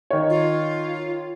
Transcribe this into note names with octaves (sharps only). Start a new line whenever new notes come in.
D#3 C#5
F4